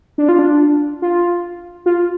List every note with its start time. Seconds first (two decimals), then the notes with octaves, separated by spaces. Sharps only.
0.18 D4
0.29 F4
0.39 D4
1.02 F4
1.86 F4